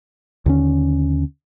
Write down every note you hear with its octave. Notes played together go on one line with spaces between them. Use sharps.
D#2 D3 C#4